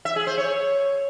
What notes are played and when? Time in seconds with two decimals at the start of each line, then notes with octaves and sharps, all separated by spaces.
0.05 E5
0.16 G#4
0.27 C5
0.38 C#5